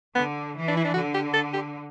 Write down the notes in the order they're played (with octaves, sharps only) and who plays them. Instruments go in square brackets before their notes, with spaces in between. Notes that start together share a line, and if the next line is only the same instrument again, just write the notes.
[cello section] D3 [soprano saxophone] B3
[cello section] E3
[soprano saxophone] D4
E4
D4
[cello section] D3 [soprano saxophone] F#4
[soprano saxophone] G4
A4
G4